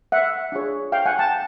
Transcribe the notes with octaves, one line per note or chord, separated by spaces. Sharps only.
E5 F#5
D4 F4 G#4 C#5
F5 G5
F#5 G#5
G5 A5